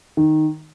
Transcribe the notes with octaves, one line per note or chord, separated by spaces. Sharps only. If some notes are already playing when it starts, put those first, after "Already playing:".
D#3